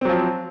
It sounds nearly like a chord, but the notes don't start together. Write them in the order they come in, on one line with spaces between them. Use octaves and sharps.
C4 F#3 F3